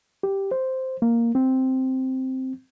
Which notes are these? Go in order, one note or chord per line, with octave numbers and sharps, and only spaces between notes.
G4
C5
A#3
C4